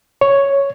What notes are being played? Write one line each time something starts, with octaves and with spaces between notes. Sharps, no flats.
C#5